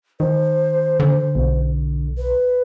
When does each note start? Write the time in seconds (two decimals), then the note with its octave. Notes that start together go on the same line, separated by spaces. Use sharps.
0.20 D#3 C5
1.00 D3
1.35 B1
2.18 B4